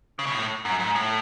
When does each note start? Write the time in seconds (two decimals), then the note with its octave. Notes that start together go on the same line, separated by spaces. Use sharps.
0.19 C#3
0.27 B2
0.35 A2
0.65 F#2
0.80 G#2
0.95 A2